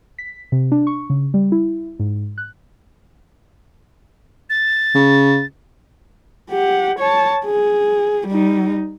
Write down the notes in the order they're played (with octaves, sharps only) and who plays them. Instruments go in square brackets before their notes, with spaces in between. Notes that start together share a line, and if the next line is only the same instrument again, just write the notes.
[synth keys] B6
C3
D4
C#6
C#3
G3
E4
G#2
F#6
[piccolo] A6
[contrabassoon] C#3
[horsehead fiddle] G4 F#5
C#5 A5
G#4
G3 D#4